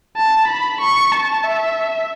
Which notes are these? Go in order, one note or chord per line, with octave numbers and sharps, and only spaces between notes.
A5
B5
C#6
A5
E5